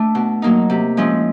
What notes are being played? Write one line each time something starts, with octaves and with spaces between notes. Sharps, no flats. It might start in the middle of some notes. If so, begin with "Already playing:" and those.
Already playing: A3 D4
B2
F#3 A#3 D#4
C3
F3 G#3 C#4 E4